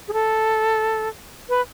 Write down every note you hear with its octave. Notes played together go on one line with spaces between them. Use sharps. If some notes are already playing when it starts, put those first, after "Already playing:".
G#4
A4
B4